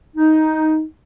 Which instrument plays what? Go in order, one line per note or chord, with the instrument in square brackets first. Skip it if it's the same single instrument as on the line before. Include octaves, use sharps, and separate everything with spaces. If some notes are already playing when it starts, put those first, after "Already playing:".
[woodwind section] D#4